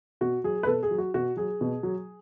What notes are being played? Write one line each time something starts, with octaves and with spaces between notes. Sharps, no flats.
B2 F#4
F#3 G#4
B4
B2 A4
G#4
F#3
F#4
B2 F#4
F#3 G#4
B2
F#3